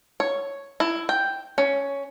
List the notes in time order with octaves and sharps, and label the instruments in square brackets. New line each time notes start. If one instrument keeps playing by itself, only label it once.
[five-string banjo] C#5
E4
G5
C#4